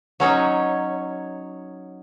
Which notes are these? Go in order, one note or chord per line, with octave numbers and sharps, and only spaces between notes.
F#3 C#4 D#4 C#5